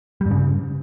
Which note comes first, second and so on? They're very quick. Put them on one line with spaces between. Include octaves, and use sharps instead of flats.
G3 G2 C#3